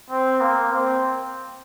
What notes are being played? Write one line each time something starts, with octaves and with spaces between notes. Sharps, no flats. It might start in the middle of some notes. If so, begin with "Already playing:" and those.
C4
A#3
C4